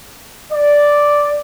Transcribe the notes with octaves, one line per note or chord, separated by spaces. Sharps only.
D5